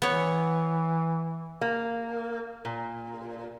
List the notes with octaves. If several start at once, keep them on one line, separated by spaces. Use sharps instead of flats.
E3 B3 C#5
A#3
A#2